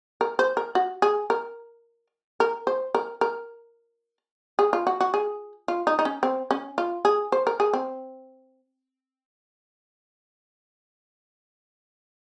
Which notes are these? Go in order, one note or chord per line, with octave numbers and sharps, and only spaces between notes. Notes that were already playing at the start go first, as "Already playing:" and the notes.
A#4
C5
A#4
F#4
G#4
A#4
A#4
C5
A#4
A#4
G#4
F4
F#4
F#4
G#4
F4
D#4
D#4
C#4
C4
C#4
F4
G#4
C5
A#4
G#4
C4